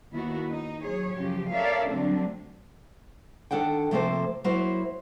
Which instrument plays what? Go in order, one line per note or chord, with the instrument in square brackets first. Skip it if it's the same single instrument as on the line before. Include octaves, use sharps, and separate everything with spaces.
[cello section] D#2 D#3 B3 E4 F#4
D#4
F#3 G#4 C#5
F#2 C#3 F3 G4
A4 A#4 C#5 D5 E5 F5
D3 F#3 G3 A3 C4 D4
[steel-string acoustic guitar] D#3 D4 A4 F#5 G5
C3 F3 A3 A#3 A4 C5
F#3 A#3 E4 F#4 C5